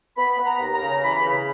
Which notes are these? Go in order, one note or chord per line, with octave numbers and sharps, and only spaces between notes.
B3 B5
B3
A#5
D#2
A#5
C#3
E3 B5
C#3